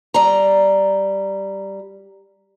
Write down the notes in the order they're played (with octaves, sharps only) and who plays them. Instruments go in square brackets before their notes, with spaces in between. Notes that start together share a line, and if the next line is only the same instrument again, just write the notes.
[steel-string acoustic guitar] G3 A#5